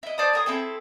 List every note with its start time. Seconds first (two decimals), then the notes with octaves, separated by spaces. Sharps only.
0.03 E4 D#5
0.18 C5 D5 A5 D#6
0.33 G#4 A#4 D#6
0.46 C4 E4 G#4 A4